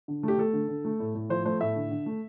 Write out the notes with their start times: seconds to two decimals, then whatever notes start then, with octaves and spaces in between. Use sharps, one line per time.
0.08 D3
0.23 A3 G4
0.38 A3 A4
0.53 D3
0.68 D3
0.85 A3
1.00 A2
1.15 A2
1.29 F3 C5
1.45 A3 C5
1.60 A2 E5
1.76 D3
1.91 D3
2.06 A3